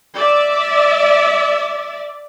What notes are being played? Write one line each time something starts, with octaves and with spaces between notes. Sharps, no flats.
D5 E5